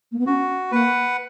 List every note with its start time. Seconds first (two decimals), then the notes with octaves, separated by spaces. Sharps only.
0.12 A#3
0.19 B3
0.26 C#4 F#4
0.71 A#3 B4 F#5